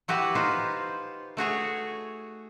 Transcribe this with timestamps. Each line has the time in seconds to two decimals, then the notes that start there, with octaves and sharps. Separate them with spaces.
0.08 E4 F#4 G4 B4
0.35 D#4 F4 B4 C5
1.37 A3 F#4 G#4 C#5